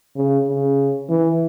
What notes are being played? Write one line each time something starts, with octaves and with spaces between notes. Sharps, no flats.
C#3
C#3
E3